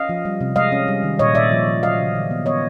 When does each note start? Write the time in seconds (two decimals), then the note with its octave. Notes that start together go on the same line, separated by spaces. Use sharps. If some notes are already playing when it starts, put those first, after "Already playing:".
Already playing: C#4 D#5 F5
0.09 F3
0.25 G3
0.41 C3
0.56 G#3 D#5 F5
0.72 C#4
0.88 G3
1.03 D#3
1.19 A#2 C#5 D#5
1.35 A#2 D5 E5
1.52 F3
1.67 F3
1.83 F#3 D#5 F5
1.99 C#3
2.15 D#3
2.31 B3
2.46 B3 C#5 D#5